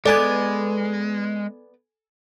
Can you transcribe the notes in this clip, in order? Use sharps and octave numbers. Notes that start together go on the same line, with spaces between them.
G#3 B3 A4 B4 D5 G#5 G#6